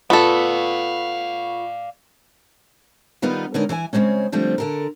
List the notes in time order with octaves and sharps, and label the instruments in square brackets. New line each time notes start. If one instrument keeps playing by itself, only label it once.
[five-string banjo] B3 A4 [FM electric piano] F4 B5 C#6 [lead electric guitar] D5 F5
[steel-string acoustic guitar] D#3 G3 B3 D#4 F4 B4
D3 G#3 B3 C#4 D#4 A#4
E3 E4 C#5 G#5
C#3 F#3 G#3 C4 C#4
D3 F3 G3 A3 C4
D3 A4 A#4